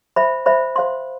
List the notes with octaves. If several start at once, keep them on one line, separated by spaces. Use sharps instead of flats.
C5 E5 B5
C5 E5 B5
C5 F5 C6